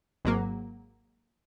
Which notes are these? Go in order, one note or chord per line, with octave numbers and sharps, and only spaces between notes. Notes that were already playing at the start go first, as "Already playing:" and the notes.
G#1 G#2 F#3 A#3